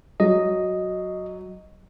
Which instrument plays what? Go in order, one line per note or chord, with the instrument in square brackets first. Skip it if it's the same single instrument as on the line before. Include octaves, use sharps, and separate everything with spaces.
[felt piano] F#3 [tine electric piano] D#5